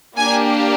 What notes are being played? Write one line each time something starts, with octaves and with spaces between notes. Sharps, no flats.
A#3 D4 G4 G#5